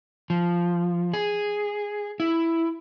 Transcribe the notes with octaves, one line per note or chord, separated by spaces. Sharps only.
F3
G#4
E4